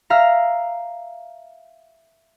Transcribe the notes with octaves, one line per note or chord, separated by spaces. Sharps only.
E5 F5 A#5